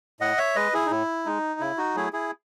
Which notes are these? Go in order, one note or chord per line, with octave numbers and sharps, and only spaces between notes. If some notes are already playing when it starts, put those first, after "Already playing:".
A2 D#5 F#5
C#5 E5
G#3 B4 D#5
E4 G#4
D#4
A2 E4
G#3 D#4
C#3 E4
D#4 F#4
F#3 A3 E4 G#4
E4 G#4